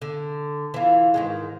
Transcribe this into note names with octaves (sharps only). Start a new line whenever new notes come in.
D3
E3 F4
G#2 D#3 G#3